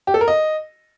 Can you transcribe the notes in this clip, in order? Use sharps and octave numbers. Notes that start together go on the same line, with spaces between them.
G4
A4
A#4
D#5